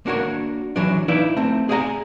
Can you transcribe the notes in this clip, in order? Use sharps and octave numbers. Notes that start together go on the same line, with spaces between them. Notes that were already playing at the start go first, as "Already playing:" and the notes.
A#3 D4 F#4 A#4 C#5
E3 F#3 D4
D#4 E4 B4 D5 E5 F5
A3 C4
G#4 D5 D#5 F5 G#5 A#5